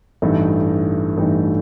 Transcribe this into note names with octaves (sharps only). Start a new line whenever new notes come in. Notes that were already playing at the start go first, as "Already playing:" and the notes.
A1 G2 E3 A3 D#4
A1 G2 E3 A3 D#4